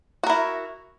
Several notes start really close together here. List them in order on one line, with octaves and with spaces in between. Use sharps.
F#4 A#4 E4